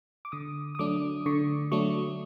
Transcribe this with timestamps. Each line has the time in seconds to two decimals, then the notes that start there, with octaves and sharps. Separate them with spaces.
0.25 D6
0.32 D3 D#6
0.75 D#6
0.79 F#3 A3 D4 D6
1.26 D3 C#6
1.71 F#3 A3 D4 C#6